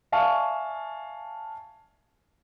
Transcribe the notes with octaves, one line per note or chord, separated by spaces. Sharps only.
D5 E5 F5 G#5 A5 C#6